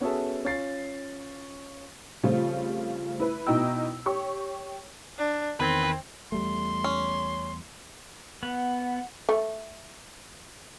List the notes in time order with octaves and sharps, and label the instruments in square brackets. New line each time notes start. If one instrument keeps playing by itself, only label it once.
[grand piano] B3 C#4 F#4 G#4 A4 E5
C#4 F4 A6 C7
[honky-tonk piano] C#3 F3 G3 A3 C4 F4
E4 B4
B2 D#4 E4 G5 E6
G4 C#5 C#6
[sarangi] D4
[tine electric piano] E2 D#3 G#6 [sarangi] C4 [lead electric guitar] B4
[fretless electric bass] E2 G3 A3 [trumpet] C6
[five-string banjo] C#4
[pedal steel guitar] B3 [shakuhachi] F#5
[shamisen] A3